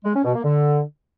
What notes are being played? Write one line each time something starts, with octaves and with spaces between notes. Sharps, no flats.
G#3
C#4
B2
A#3
D3